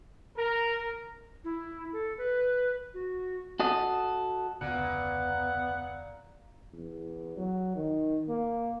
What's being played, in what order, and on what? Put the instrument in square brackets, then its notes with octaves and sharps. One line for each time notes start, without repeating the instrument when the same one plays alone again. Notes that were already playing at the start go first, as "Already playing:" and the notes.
[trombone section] A#4
[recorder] E4
A4
B4
F#4
[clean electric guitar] F#4 A4 D#5
[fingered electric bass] F1 D2 C#3 [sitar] A#2 [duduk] B3 [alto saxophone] F#5
[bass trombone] E2
F#3
D#3
A#3